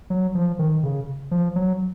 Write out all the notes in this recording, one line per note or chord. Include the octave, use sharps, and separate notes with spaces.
F#3
F3
D#3
C#3
F3
F#3